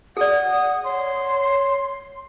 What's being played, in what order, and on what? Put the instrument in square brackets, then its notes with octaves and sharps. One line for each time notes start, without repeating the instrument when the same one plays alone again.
[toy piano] G#4 D5 [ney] F#5 [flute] D#6
[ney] C#5 [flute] C6